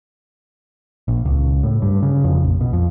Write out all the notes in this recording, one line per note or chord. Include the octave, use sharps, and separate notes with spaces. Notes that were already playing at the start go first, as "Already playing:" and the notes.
A#1
C#2
A2
G2
C#3
F2
A#1
B2
F2